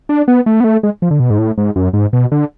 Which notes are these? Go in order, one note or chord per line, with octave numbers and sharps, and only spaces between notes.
D4
B3
A3
B3
A3
G#3
F3
D3
B2
G#2
A2
G#2
F#2
G#2
B2
D3